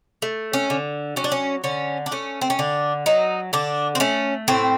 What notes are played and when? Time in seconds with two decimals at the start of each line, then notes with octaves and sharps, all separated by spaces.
0.22 A3
0.53 C#4
0.70 D3
1.16 F#3 C#4
1.24 D4
1.32 C#4
1.64 D3 C#4
2.06 D4
2.12 A3 C#4
2.41 C4
2.50 C#4
2.59 D3 D4
3.06 F#3 D#4
3.53 D3 D4
3.95 C4
4.00 A3 C#4
4.48 A2 C4